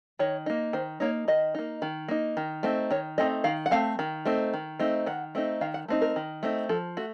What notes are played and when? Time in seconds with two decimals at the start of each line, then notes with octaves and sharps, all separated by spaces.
0.19 D#3 C#5
0.46 A#3 D#4
0.73 D#3 C5
1.00 A#3 D#4 C#5
1.28 D#3 D#5
1.55 A#3 D#4
1.82 D#3
2.08 A#3 D#4
2.37 D#3
2.63 A3 C4 D#4
2.91 D#3 C#5
3.18 A3 C4 D#4 D#5
3.44 D#3 F5
3.66 F#5
3.71 A3 C4 F5
3.99 D#3
4.25 A3 C4 D#4
4.53 D#3
4.79 A3 C4 D#4
5.06 D#3 F#5
5.35 A3 C4 D#4
5.61 D#3 F5
5.74 F#5
5.88 A3 C4 D#4
6.01 A#4
6.16 D#3
6.43 A3 C4 D#4
6.69 F3 A4
6.97 A3 F#4